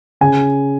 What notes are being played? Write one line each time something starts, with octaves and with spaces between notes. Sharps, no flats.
C#3 G#5